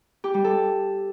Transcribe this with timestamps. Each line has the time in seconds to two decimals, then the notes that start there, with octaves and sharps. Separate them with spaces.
0.24 G4
0.34 G3
0.44 A4